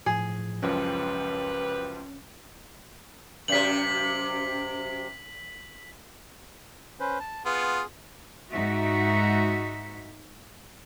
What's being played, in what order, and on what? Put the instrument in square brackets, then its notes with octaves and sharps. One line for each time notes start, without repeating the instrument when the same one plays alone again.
[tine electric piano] A2 F3 [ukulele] G#4
[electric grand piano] C#2 F#2 F3 [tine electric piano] C#4 [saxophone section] G4 B4
[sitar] F#2 C3 [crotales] B6 F#7
[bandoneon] C#4 B4 C5
A5
[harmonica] B3 F4 [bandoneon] G#4
[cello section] G#2 D#4 F#4 E5